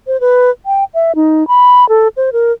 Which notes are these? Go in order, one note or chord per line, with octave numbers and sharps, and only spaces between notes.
C5
B4
G5
E5
D#4
B5
A4
C5
A#4